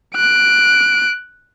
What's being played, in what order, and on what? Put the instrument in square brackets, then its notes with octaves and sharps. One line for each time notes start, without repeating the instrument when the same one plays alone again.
[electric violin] F#6 D7